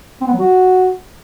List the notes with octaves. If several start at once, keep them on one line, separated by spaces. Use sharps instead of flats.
C4
B3
F#3
F#4